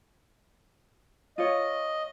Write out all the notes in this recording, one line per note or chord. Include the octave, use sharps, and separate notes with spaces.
F4 C#5 D#5